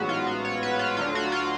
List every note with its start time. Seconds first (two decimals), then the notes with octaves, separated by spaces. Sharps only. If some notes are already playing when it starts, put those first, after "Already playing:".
Already playing: A1 G#2 F#3 B3 F#4
0.09 F4
0.27 F#4
0.45 C#5
0.63 B4
0.79 F4
0.97 D2 D3 F#3 F4
1.15 F#4
1.32 F4